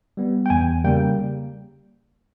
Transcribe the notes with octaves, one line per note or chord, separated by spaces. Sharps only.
G3 B3
G5
E2 G#5
C#3 G3 A#3 G5